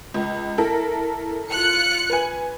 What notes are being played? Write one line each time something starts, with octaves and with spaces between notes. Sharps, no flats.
C#2
E4 A4 A#4
F4 F#6 C#7
B4 G#5